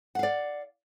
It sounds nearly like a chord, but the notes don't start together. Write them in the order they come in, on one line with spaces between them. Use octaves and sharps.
F#5 F5 D5